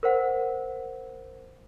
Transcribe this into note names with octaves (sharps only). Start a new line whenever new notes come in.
A#4 C5 F#5